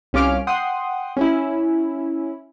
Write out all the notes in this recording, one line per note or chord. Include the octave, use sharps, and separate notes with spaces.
C2 C#4 F4 D6 F6 D7
F#5 G5 C6 D#6
C#4 E4